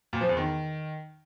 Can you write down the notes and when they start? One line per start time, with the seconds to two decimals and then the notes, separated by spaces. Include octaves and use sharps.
0.13 A#2
0.21 F3
0.29 E2
0.37 D#3